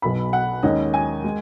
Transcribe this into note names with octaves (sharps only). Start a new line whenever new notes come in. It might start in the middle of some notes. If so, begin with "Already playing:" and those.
B1 B2 B3 B5
F#5
D#2 D#3 G#3 C#4 D#5
G#5
G#3